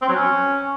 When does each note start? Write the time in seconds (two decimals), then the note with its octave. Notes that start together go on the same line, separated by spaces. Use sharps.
0.02 C4
0.09 F#3
0.16 C#4